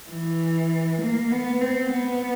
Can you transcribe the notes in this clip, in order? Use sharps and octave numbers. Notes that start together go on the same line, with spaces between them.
E3
A#3
B3
C4
B3